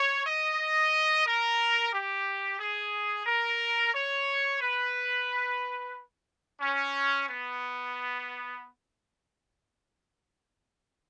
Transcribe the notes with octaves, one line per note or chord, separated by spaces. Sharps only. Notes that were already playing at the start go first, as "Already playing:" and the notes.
Already playing: C#5
D#5
A#4
G4
G#4
A#4
C#5
B4
C#4
B3